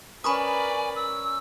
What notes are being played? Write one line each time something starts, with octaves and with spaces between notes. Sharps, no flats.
C#4 A#4 B4 D5 G#5 B5 C#6 D#6
E6